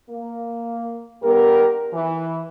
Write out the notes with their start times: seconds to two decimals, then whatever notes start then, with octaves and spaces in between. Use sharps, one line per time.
0.10 A#3
1.24 G2 B3 G4 A#4
1.94 E3